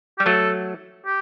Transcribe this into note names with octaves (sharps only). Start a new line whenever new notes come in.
G3 G4
F#3 A3 A4
G4